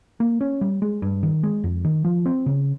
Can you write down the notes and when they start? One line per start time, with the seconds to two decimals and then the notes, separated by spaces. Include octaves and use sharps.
0.20 A#3
0.41 C#4
0.61 G3
0.82 G#3
1.02 G2
1.23 D#3
1.43 G#3
1.64 F2
1.84 D#3
2.05 F3
2.26 C4
2.46 C#3